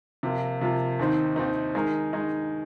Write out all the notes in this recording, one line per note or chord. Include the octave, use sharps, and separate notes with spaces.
C3 F3 A#3 F4
C3 F3 A#3 F4
D#2 D#3 C4 D#4
D#2 D#3 C4 D#4
D#3 G#3 D#4 A#4
D#3 G#3 D#4 A#4